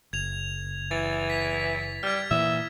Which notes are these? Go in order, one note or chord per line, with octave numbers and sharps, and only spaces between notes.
F#1 G#6 F7
E3 A6
B6
G3 F6 G#6
A#2 E3 E5